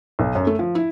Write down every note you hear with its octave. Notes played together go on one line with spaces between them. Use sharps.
B1
F#2
A3
F3
E4